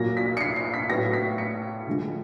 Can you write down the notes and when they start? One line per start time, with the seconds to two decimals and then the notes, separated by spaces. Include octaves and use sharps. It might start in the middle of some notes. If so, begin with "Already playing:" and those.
Already playing: A#2 F#3 A#3 A#6
0.17 B6
0.37 C#7
0.41 C7
0.56 C7
0.74 B6
0.89 A2 F#3 B3 A#6
1.13 B6
1.38 C#7
1.86 D3 F3 G#3